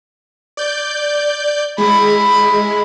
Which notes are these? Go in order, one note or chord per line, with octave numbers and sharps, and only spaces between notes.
D5 G6
G#3 E4 B5